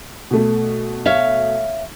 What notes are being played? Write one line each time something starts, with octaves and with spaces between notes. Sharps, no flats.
B2 A3
C#5 E5 F5